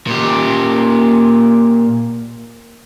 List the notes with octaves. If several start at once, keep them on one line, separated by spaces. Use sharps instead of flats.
A#2 G4